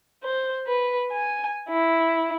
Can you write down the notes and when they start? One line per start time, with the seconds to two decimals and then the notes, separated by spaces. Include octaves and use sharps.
0.23 C5
0.67 B4
1.12 G#5
1.69 E4